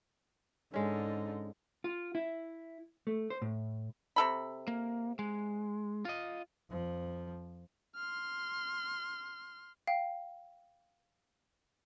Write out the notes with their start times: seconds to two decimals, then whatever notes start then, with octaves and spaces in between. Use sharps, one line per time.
0.74 G#2 D3 G#3 C#4 D#4
1.84 F4
2.15 E4
3.07 A3
3.30 C5
3.42 A2
4.16 C3 A4 B5
4.68 A#3
5.19 G#3
6.05 F4 D#5
6.69 F2 F3
7.96 C6 F6
9.87 F5 G5